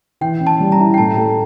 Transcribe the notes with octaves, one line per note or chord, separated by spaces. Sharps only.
E3 G5
C#4
A5
G3
A#5
E4
G5
A2 A5
A3